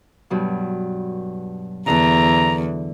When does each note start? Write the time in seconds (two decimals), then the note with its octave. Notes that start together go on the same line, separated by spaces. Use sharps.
0.30 G2 B2 F#3
1.87 E2 D3 A4 A#5